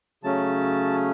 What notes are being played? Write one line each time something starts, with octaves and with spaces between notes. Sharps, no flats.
C#3 F#3 A3 C#4 A5